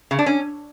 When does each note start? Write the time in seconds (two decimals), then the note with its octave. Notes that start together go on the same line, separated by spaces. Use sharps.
0.11 C#3
0.19 D4
0.26 C#4